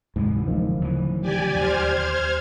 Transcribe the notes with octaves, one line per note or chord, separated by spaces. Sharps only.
D2 G#2 C3 E3
D1 D#3 F3
C#3 E3
G4 D5 G#5
D#2 G3 C5 F6 G#6